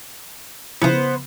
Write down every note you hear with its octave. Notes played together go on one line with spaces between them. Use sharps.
C#3 F3 B3 E4 C5